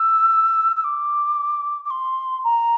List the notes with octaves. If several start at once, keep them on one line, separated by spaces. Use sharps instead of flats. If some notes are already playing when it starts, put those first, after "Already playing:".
Already playing: E6
E6
D6
D6
C6
A#5